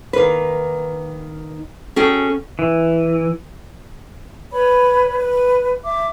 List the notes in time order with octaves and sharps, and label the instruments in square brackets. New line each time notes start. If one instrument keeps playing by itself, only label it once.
[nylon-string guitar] D#3 A#3 B4
C#4 F#4 G#4 A4 G5
[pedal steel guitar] E3
[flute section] B4 C#5 B5
B4
E5 D6